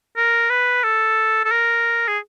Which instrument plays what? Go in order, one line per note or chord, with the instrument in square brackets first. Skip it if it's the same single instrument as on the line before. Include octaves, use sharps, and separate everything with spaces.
[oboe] A#4
B4
A4
A4
A#4
G#4